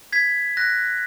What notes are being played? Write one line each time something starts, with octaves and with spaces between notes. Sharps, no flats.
G#6 B6
F#6 A#6